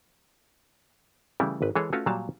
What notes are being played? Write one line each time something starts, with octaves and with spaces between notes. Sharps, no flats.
C#3 E3 G3 A3 E4
G#1 B4
E3 G#3 G#4 A4 C#5
A3 C#4 F4 F#4 B4 C#5
A#2 F#3 G3 F5 A5